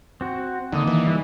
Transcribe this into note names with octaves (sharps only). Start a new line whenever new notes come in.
C4 F#4
D3 D#3 A#3 D#5
E3
G3 A#3